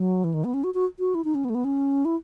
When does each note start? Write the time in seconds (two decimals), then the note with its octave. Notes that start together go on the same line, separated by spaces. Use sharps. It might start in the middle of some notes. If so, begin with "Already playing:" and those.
Already playing: F#3
0.24 E3
0.34 D#3
0.44 B3
0.54 C#4
0.64 F#4
0.74 F#4
0.99 F#4
1.15 E4
1.24 D#4
1.35 C#4
1.45 B3
1.50 A3
1.55 B3
1.65 C#4
2.05 E4